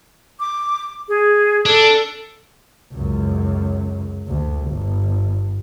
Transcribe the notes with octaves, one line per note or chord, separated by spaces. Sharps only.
D6
G#4
D4 A4
C#2 F#2
D2
G1